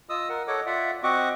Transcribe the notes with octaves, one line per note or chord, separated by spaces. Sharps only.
F4 D#5 D#6 E6
A#4 F#5
A4 C#5 D#5 F#5 D6
F4 D5 E5 F#5
C4 F#4 D#5 F#5 C#6 D6